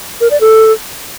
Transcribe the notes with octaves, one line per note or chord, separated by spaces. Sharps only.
A#4
D5
A4